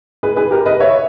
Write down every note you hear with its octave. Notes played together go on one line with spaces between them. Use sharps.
G#4 B4
G#4 B4
G4 A#4
B4 D#5
C#5 E5